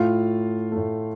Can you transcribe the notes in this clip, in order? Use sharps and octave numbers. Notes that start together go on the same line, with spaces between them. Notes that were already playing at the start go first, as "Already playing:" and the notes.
Already playing: A2 A3 F4 F5
A2 A3